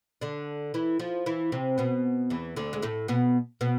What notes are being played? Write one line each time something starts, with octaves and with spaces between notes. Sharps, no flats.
D3 D4
E3 E4
F3 F4
E3 E4
C3 C4
B2 B3
E2 E3
D2 D3
G#3
A2 A3
B2 B3
B2 B3